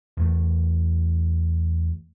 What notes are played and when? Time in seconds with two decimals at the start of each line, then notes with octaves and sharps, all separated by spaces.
0.17 E2 A3